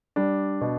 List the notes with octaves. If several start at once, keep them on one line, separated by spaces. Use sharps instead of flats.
G3 D4
B2